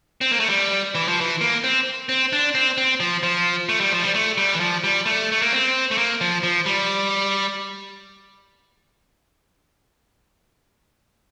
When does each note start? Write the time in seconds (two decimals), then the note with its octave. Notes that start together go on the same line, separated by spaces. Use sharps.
0.21 C4
0.32 A#3
0.40 A3
0.49 G3
0.95 E3
1.08 F3
1.21 E3
1.41 A#3
1.64 C4
2.09 C4
2.33 D4
2.55 C4
2.78 C4
3.00 F3
3.23 F3
3.69 A3
3.81 G3
3.92 F3
4.03 G3
4.14 A3
4.38 G3
4.53 E3
4.60 F3
4.84 G3
5.06 A3
5.32 A3
5.42 A#3
5.52 C4
5.91 A3
5.98 A#3
6.21 F3
6.43 F3
6.66 G3